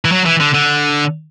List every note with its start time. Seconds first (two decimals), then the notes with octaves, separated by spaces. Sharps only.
0.05 E3
0.12 F#3
0.26 E3
0.40 D3
0.54 D3